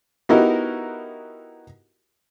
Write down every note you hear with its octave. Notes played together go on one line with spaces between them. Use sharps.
B3 D#4 E4 F#4 G4 A#4